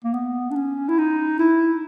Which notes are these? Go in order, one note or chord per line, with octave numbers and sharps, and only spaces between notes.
A#3
B3
D4
C#4
E4
D#4
E4